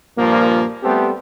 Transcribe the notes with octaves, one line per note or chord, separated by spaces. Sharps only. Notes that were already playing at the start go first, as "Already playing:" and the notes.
G2 A#2 F3 A#3
G3 A3 B3 C4 G4 A4